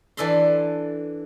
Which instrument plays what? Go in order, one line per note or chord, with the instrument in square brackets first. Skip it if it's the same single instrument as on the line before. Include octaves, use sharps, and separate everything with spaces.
[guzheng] E3 D4 A4 B5 C6